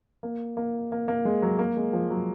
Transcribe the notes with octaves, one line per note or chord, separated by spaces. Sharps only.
A#3
A#3
A#3
A#3
G#3
F#3
A#3
G#3
F3
F#3